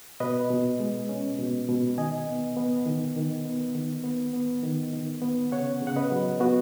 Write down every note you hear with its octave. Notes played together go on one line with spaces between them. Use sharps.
B2 B4 D#5
B2
G#3
C#4
B2
B2
D#3 D#5 G#5
B3
B3
D#3
D#3
B3
D#3
B3
B3
D#3
D#3
B3
C#3 C#5 F#5
C#3
F#5
B4 D#5
F#3
B3 F#4